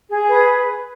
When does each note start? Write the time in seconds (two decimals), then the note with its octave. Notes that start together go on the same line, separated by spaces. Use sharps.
0.09 G#4
0.28 B4